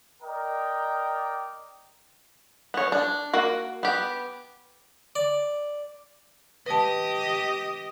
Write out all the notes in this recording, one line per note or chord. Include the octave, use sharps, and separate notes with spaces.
A#4 D5 D#5 G5 A#5
B3 C#5
D4
A#3 F#4
B3 G4
D5
G4 B4 D#5 A5